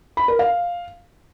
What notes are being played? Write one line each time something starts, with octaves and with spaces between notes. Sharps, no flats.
B5
A#4
F5